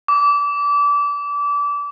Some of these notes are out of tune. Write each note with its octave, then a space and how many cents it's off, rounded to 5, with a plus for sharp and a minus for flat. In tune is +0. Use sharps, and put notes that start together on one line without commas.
D6 -25